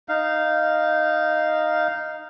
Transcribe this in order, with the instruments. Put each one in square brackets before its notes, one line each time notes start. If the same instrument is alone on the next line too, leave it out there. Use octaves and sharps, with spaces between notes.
[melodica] D#4 F5